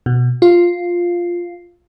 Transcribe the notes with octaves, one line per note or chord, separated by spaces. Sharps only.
B2
F4